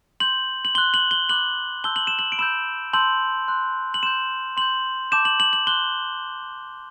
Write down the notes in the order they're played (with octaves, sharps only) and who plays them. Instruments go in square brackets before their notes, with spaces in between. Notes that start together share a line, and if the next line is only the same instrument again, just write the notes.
[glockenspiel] C6 G6 F#7
F#7
C6 G7
F#6
F#7
G7
B5 D6 F#6 F#7
A5 C6 E6 G6 G7
F#7
E7
F#7
D7
B5 E6 G6 E7
A5 C6 E6 G6 F#7
C6 F#6
F#7
C6 G6 E7
C6 G6 F#7
A5 D6 G6 E7
F#7
F#7
F#7
C6 F#6 G7